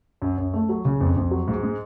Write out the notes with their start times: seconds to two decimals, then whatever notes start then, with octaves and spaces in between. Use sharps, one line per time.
0.22 F#2
0.38 F#2
0.54 A3
0.69 F#3
0.85 C#3
1.00 F2
1.16 F2
1.31 F#3
1.48 G#2
1.63 G#3